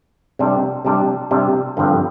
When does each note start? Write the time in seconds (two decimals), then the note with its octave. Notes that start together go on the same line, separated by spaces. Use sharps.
0.39 C3 G3 D4
0.85 C3 G3 D4
1.31 C3 G3 D4
1.77 G2 D3 F3 C4